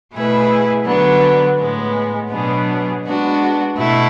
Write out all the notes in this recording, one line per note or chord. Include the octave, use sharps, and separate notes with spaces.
B2 A3 E4 G#4 B4
D3 F#3 B3 D4
A2 G#3 B3
B2 F#3 B3 D4 G#4
G#3 B3 D4 F#4
B2 A3 E4